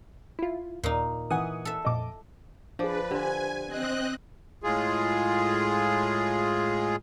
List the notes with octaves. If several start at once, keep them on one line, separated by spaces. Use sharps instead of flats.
E4 F4
D#2 A#2 D#4
E3 F#5 G#5 D#6
A4 E5
F2 A#2 D#5 D6
F3 D4 G#4 B4 D5
D3 G4 C5 G#5
C4 D#5 F#6
A2 G#3 F4 G#4